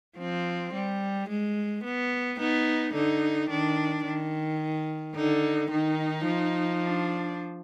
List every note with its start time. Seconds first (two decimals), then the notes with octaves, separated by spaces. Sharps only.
0.18 F3 C4
0.74 G3
1.29 G#3
1.84 B3
2.40 B3 D#4
2.94 D3 D#4
3.49 D#3 D4
4.05 D#3
5.15 D3 D#4
5.71 D#3 D#4
6.26 F3
6.81 D4